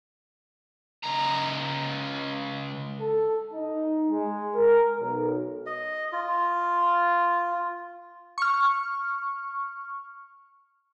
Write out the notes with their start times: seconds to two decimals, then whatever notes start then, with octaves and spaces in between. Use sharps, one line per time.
1.04 C#2 A#5
3.00 A4
3.53 D#4
4.10 G#3
4.55 A#4
4.99 B1
5.66 D#5
6.12 F4
8.38 C#6 F6